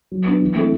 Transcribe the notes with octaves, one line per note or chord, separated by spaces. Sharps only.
F#3
B3 D4
E3
A3 C4 E4 A4